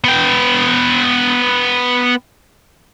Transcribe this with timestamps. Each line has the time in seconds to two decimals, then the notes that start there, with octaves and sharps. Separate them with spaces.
0.04 B3 G5